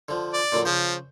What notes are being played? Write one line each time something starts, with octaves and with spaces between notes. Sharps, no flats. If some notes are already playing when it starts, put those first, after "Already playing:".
D3 F3
D5
A#2 D3 F#3
C#3 F3 C5